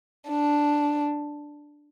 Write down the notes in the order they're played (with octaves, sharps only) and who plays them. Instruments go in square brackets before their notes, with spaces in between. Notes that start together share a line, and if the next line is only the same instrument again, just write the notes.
[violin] D4